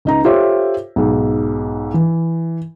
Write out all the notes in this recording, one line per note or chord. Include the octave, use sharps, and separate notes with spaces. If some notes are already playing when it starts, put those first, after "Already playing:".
C#2 D#4 A#5
F4 G4 A4 C5 C#5 E5
B1 G#2
E3